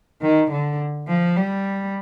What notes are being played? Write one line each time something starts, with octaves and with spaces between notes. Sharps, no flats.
D#3
D3
F3
G3